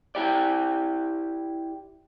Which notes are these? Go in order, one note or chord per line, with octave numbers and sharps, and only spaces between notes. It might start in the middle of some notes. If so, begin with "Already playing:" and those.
E4 G4 D5